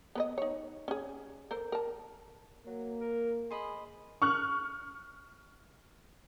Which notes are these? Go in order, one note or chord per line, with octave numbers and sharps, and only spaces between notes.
B3 B4 D#5
D#4 C#5
C#4 G#4
A4 A#4 C5
A#4 A5
F#3 A#3
A#4
G#4 C5 D#5 B5
C#6 F6 F#6